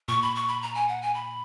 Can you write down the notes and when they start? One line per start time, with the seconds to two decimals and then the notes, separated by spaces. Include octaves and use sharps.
0.08 A#2 C#6
0.22 B5
0.35 C#6
0.48 B5
0.62 A#5
0.75 G#5
0.88 F#5
1.02 G#5
1.14 B5